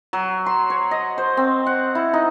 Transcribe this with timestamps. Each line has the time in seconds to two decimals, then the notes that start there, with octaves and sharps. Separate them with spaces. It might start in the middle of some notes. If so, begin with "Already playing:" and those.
0.13 F#3
0.46 C6
0.70 C#5
0.91 D#5
1.18 C5
1.37 C4
1.66 F#5
1.95 E4
2.13 D#4